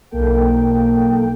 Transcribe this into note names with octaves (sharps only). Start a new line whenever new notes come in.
B1 A#3 A4 G5